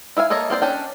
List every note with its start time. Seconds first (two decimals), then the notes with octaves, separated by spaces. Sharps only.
0.17 E4 E5 F5 G#5
0.30 A#3 A4 C#5 D#5 A#5
0.50 A#3 C4 C5 D5
0.62 C#4 D4 G5